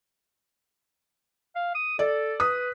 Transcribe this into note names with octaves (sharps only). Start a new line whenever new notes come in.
F5
D#6
A4 D5
B4 D#6